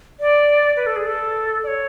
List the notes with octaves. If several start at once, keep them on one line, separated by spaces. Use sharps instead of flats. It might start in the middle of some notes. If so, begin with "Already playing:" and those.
D5
B4
A4
G#4
A4
D5
C#5